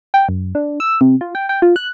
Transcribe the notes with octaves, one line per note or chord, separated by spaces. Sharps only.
G5
F#2
D4
E6
C3
F4
G5
G5
F4
F#6